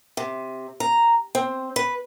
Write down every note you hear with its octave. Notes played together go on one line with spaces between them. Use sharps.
C3
A#5
C4
B4